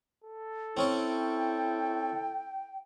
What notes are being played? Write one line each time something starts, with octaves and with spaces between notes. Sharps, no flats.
A4
C4 C#4 E4 C#5 G5